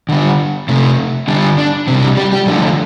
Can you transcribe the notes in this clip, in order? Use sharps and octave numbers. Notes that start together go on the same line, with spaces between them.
D3 G3
C3 A3
D3 G3 D4
D4
C3 G3 C4
D4
G3 G4
G3 G4
D3 F3 A3 D4